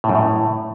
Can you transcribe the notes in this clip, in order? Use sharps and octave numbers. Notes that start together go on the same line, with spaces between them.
A2
F#2
A2